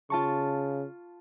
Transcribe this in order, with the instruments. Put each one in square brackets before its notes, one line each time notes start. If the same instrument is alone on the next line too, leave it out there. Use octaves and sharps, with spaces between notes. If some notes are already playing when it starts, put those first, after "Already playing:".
[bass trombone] C#3 [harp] F4 A5 C#6